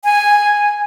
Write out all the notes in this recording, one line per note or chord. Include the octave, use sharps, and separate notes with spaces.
G#5